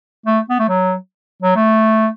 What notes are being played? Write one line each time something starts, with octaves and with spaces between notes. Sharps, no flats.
A3
B3
A3
F#3
F#3
A3